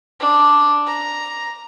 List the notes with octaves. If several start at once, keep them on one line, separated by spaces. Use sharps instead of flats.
D4
A#5